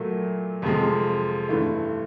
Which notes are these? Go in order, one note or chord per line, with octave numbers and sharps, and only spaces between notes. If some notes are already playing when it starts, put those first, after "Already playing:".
Already playing: A#2 F#3 A3
F2 C3 F3 G#3
G2 E3 A3